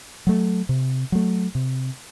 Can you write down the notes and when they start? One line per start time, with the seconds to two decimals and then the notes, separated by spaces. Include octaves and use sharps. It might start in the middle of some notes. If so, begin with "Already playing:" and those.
0.27 F#3 A3
0.69 C3
1.12 F#3 A3
1.55 C3